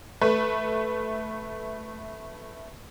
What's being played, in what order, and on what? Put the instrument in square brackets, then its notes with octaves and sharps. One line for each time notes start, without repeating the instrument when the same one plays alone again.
[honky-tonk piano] A3 B4